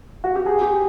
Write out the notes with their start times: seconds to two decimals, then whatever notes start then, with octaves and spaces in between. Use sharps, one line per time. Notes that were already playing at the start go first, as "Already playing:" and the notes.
0.24 F#4
0.36 G4
0.46 G#4
0.62 G4